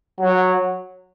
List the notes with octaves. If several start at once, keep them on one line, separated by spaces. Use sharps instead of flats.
F#3